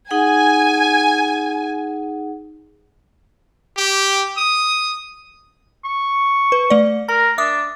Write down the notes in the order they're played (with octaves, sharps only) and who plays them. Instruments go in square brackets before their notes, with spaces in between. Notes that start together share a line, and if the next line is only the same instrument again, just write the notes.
[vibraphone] D#4 G#4 F#5 [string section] G#5
[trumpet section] G4
D#6
[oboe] C#6
[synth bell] B4
A3 D5
[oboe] A#4 [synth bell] A#5
[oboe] D4 [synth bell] E5 D6 D#6